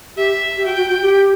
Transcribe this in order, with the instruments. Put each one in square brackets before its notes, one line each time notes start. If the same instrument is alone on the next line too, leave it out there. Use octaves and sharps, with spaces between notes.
[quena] G4 [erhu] E5
[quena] G4
[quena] F#4 [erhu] G5
[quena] F#4
F#4
G4